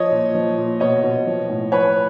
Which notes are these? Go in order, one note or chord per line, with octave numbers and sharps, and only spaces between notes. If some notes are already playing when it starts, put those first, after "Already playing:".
Already playing: F3 C#5 D#5
A#2
F3
A#2
B2 C#5 D#5
B2
F3
A2
F3 B4 C#5